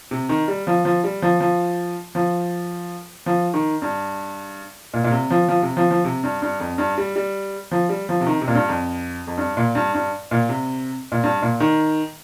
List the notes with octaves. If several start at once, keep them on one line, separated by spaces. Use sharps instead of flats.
C3
D#3
G3
F3
F3
G3
F3
F3
F3
F3
D#3
G2
A#2
A#2
C3
F3
F3
C3
F3
F3
C3
G2
G2
F2
G2
G3
G3
F3
G3
F3
C3
D#3
C3
A#2
G2
F2
F2
G2
A#2
G2
G2
A#2
C3
A#2
G2
A#2
D#3